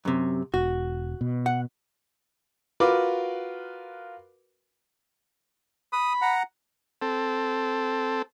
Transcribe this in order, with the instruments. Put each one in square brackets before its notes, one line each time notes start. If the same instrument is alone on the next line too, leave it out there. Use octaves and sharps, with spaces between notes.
[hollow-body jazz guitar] F#2 C3
[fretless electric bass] E1 [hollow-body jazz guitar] F#4
[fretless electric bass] B2
[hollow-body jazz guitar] F#5
[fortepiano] F4 F#4 A#4 B4 D6
[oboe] B5 [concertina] D#6
[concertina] F#5 A#5
[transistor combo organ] C4 A4